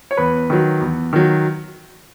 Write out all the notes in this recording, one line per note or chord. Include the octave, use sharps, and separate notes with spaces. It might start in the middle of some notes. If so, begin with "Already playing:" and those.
C#5
E2 B4
D#3 F#3
E2
D#3 F#3